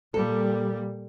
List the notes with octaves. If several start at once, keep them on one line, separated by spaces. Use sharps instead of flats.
A#2 G3 A4